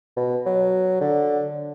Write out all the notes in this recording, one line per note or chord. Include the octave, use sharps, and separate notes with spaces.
B2
F#3
D3